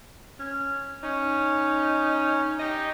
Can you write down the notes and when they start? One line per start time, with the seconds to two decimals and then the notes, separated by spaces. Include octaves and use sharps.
0.39 C#4
1.03 C#4 D#4
2.59 D#4 G4 D#5